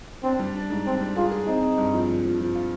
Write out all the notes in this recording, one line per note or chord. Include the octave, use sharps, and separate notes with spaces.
C4 D4
G3
D4
G#2
C4 D4
G3
F4 G#4
G#4
C4 D#4
C4
G2
F3
F3
F3
F3
F4